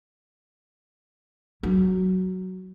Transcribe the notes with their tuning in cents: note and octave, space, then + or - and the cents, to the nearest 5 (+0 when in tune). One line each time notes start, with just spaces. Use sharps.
F#3 +5 E4 +0